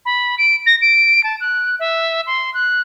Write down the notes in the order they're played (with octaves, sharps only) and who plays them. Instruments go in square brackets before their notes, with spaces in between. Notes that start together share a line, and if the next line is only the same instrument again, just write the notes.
[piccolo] B5
D7
A#6
D7
A5
F#6
E5
C6
F#6